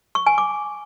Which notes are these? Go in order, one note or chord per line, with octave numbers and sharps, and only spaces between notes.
C#6
G#5
D6